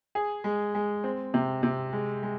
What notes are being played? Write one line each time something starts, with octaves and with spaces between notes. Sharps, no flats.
G#4
G#3
G#3
C4
C3
C3
G#3
G#3